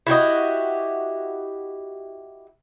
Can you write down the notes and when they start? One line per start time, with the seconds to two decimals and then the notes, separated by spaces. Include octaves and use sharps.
0.07 E4 F#4 G4 D#5